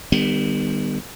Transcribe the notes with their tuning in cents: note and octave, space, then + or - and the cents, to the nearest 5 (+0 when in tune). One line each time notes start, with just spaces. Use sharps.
D#3 -40 G3 +15 B3 +15